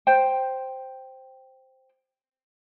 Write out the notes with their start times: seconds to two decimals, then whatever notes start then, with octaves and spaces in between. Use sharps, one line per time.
0.07 C5 G5